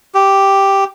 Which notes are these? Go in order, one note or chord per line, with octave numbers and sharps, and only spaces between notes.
G4